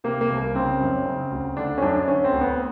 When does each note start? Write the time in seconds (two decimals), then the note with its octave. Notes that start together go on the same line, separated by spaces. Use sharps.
0.04 C3 A#3
0.21 A#3
0.30 C2
0.38 A#3
0.55 C#3 C4
0.80 F#2
1.06 C#3
1.31 D2
1.57 D3 D4
1.78 C#4
1.82 F#2 D4
2.08 D3 C#4
2.24 C4
2.33 D2
2.41 B3